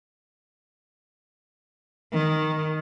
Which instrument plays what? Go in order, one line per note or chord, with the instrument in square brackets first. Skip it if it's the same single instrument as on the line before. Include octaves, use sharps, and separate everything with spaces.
[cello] D#3